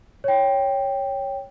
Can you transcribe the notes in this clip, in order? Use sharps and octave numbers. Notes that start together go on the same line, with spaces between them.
C#5 G5